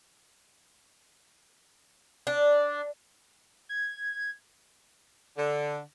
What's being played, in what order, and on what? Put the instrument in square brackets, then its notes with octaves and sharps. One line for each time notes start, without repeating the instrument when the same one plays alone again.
[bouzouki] D4
[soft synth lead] G#6
[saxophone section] D3